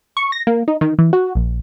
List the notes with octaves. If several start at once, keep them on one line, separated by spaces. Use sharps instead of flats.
C#6
A#6
A#3
D#4
D#3
E3
F#4
A#1